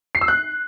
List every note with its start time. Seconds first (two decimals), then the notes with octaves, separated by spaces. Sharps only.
0.15 C7
0.21 E6
0.28 F#6